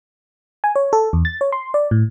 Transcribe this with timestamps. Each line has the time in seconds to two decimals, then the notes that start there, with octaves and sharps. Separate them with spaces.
0.64 G#5
0.76 C#5
0.93 A4
1.13 E2
1.25 A6
1.41 C#5
1.52 C6
1.74 D5
1.91 A2